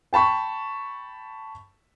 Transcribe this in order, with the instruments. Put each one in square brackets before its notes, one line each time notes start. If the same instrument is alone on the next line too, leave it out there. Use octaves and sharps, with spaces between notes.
[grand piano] G5 A5 B5 C#6